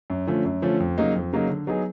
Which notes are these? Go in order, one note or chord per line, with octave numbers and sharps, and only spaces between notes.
F#2
D3 F3 A3 C#4
F#2
D3 F3 A3 C#4
F2
C#3 F#3 A#3 D#4
F2
C#3 F#3 A#3 D#4
D3
F#3 B3 D#4 G#4